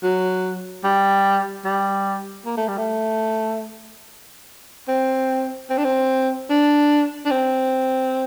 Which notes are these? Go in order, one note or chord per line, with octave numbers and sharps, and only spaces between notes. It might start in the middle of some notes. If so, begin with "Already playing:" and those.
F#3
G3
G3
A#3
A3
G3
A3
C4
C4
D4
C4
D4
D4
C4